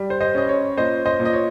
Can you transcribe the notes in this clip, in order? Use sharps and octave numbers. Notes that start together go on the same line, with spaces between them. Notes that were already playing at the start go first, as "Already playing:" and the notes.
Already playing: G3
C5
C5 D#5
C#4 D#5
C#5
A#2 C5 D#5
C5 D#5
A#2
D#5
C#5